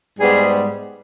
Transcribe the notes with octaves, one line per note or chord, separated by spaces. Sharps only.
G#2 G3 B3 G#4